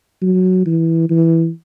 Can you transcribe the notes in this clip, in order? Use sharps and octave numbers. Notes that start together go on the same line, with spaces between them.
F#3
E3
E3